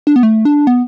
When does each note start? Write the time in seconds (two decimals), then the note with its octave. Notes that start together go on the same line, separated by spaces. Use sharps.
0.07 D4
0.16 B3
0.23 A3
0.45 D4
0.67 B3